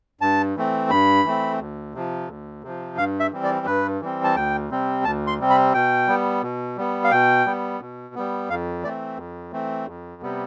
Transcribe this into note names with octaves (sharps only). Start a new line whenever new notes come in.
G2 A5
E3 A3 C4
G2 B5
E3 A3 C4
D2
C3 F3
D2
C3 F3
G2 F5
E5
E3 G3 C4
D5
G2 B4
E3 G3 C4
A5
D2 G5
C3 G3 C4
D2 A5
C6
C3 G3 C4
B5
B2 G5
G3 B3
B2
G3 B3
F5
B2 G5
G3 B3
B2
G3 B3
F2 F5
E3 A3 C4 D5
F2
E3 A3 C4
F2
C3 G3 B3